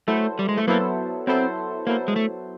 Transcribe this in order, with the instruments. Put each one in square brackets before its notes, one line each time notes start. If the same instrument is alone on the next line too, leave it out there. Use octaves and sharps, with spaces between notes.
[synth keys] F#3 B3 E4 A4 C5 [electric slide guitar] A3
[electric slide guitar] G3
G#3
A3
[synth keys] F#3 B3 E4 A4 C5 [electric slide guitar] A#3
[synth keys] F#3 B3 E4 A4 C5 [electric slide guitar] C4
[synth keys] F#3 B3 E4 A4 C5 [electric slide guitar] A#3
[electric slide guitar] G#3
A3